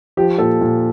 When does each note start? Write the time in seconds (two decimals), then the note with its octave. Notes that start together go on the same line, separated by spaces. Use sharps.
0.17 F3 G4
0.39 A#2 A4
0.61 A#2